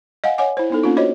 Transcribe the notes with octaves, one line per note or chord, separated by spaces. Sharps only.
D#5 F5 F#5 G#5
C#5 D#5 F#5 G#5 D6
E4 C5
B3 D#4 A4
A#3 C#4 D4 F4
F#4 C5 C#5 D#5 B5